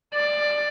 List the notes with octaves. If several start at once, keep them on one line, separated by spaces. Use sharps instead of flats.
D5